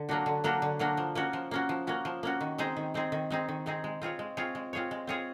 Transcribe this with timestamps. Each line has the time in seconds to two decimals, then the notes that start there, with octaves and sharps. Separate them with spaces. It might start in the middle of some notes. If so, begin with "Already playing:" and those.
Already playing: D3
0.09 F#3 A#3 D4 F#4
0.26 D3
0.44 F#3 A#3 D4 F#4
0.62 D3
0.79 F#3 A#3 D4 F#4
0.97 F3
1.15 A#3 C#4 F#4
1.33 F3
1.51 A#3 C#4 F#4
1.69 F3
1.87 A#3 C#4 F#4
2.05 F3
2.23 A#3 C#4 F#4
2.41 D#3
2.58 G#3 C4 D#4 G#4
2.77 D#3
2.94 G#3 C4 D#4 G#4
3.12 D#3
3.30 G#3 C4 D#4 G#4
3.49 D#3
3.66 G#3 C4 D#4 G#4
3.84 G#3
4.02 C4 F4 G#4 C#5
4.19 G#3
4.37 C4 F4 G#4 C#5
4.55 G#3
4.73 C4 F4 G#4 C#5
4.91 G#3
5.07 C4 F4 G#4 C#5